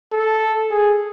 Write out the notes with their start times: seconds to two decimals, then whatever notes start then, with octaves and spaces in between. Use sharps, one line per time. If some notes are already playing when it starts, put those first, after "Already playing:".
0.12 A4
0.71 G#4